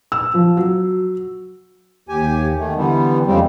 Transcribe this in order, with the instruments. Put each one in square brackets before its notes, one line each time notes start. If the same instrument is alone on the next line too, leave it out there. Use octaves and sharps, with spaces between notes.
[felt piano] E6
F3
F#3
[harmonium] D#2 G4 G#5
D#3 A3
D3 E3 G3 B3
F2 C#3 G3 G#3 C4